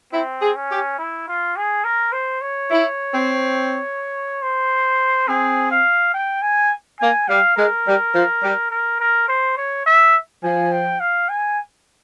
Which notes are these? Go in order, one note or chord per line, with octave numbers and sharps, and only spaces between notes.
C4 E4
G#4
C#4
G4
E4
F4
G#4
A#4
C5
C#5
E4
C4
C5
C4 G#4
F5
G5
G#5
A#3 G#5
G3 F5
G#3 A#4
G3
F3
G3
A#4
A#4
C5
C#5
E5
F3 G#5
G5
F5
G#5